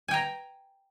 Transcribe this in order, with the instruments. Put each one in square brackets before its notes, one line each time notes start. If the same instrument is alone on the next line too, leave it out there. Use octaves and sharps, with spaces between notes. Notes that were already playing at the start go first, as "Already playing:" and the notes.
[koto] G#5
G5
A#5